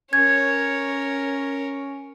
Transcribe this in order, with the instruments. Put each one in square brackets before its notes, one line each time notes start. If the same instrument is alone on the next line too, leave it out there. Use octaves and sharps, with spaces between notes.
[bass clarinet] C#4 [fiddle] A#4 C#5 [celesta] G#6